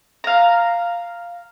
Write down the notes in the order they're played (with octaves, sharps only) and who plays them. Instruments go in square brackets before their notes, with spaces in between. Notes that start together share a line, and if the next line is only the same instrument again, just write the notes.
[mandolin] F5 A#5